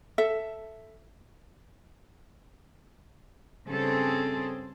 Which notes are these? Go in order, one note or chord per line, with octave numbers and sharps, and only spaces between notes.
A4 E5
G2 C#3 C4 G#4 A4